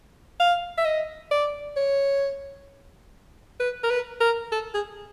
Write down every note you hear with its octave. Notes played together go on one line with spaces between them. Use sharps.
F5
E5
D#5
D5
C#5
B4
A#4
B4
A#4
A4
G#4